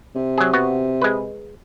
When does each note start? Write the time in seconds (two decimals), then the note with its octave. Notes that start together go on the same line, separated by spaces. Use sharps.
0.16 C3
0.38 F#3 G#4
0.54 B3 F#4
1.02 G#3 B4